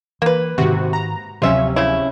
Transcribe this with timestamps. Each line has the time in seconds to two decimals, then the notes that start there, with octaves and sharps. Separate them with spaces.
0.22 E3 A#3 B4
0.58 G#2 C3 D#3 F#4
0.93 A#5
1.42 D1 C3 F3 F#3 C#4 F4 E5
1.76 C#3 E4